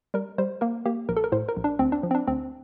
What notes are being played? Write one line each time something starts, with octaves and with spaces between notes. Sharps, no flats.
G3 A#4
G3 C5
A#3 A#4
A#3 G4
A#1 A#4
A4
A#4
A2 C5
A#4
A#1
D4
D2 C4
D4
F3
C4
D4
D2 C4